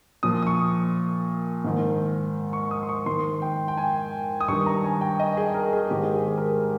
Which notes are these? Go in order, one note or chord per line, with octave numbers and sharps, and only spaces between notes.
A#2 F3 D#6
D#6
C#6
G#2 D#3
C#6
D#6
C6
C#6
G#2 D#3 C6
G5
G5
G#5
D#6
G2 D#3 C#6
A#5
G#5
G5
D#5
G#4
A#4
G#4
G#2 D#3 G4
G#4
G#4
A#4